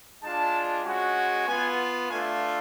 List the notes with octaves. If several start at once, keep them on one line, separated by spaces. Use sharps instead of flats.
G#3 D4 F4 A5
G#3 C#4 F#4
B3 F4 G#5
A3 D4 F4 G#5